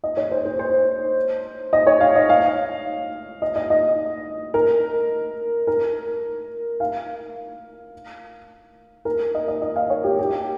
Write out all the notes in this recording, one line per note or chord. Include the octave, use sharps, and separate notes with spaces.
D#5
C#5
C5
C5
C5
D#5
C#5
F5
D#5
F5
D#5
D#5
D#5
A#4
A#4
F5
A#4
D#5
D#5
D#5
F5
C#5
G4
G4